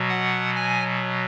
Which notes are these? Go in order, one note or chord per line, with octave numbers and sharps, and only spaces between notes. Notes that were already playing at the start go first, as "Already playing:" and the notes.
Already playing: B2 F#3
F#5
G#5